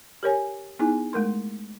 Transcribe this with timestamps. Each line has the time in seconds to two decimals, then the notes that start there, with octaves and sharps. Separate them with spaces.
0.23 G4 A#4 C#5 G#5
0.79 B3 D#4 E4 G#4 G#5
1.13 G#3 A3 A#4 C6